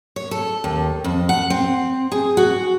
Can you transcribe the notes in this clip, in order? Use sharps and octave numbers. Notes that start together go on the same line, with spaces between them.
C#5
A4
D#2
F2
F#5
C4
G#4
F#4